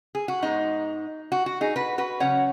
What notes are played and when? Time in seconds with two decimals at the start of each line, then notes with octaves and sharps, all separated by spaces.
0.15 G#4
0.28 F#4
0.42 G#2 G#3 B3 D#4
1.32 F#4
1.46 F#4
1.61 D#4 G#4
1.76 F#4 B4
1.98 F#4 B4
2.20 C#3 F#3 C#4 C#5 F#5